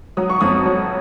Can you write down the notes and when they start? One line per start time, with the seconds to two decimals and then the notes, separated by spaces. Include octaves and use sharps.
0.17 F#3 D#6
0.30 C#6
0.41 F2 D#6
0.65 F#3